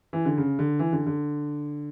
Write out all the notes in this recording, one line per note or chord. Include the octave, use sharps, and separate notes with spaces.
E3
D3
C#3
D3
E3
D3
D3